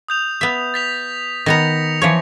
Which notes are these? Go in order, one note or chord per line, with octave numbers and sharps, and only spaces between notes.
D#6 G6 F7
B3 E5
A6 B6 F7
D#3 B3 A#5 A#6 C#7 F7
E3 F3 C#5